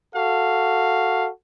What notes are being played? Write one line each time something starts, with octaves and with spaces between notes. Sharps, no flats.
F#4 A4 F5